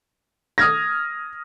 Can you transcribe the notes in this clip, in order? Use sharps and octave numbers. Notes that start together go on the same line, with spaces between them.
D#6 F6 G#6 A#6